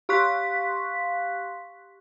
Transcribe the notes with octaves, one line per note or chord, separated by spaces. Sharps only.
G4 F5 C6 C#6 F#6 B6